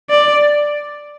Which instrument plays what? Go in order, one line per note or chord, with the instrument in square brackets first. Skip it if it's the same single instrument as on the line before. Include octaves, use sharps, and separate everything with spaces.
[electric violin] D5